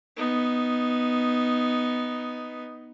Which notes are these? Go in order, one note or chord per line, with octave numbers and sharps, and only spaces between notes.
B3 D#4